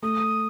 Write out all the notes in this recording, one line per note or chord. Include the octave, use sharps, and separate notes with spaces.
A3 D#6